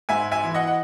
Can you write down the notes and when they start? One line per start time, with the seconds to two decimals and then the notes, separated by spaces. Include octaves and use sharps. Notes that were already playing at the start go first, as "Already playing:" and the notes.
0.09 G#2 E5 G#5
0.31 E5 G#5
0.44 E3
0.54 D#5 F#5
0.67 F#5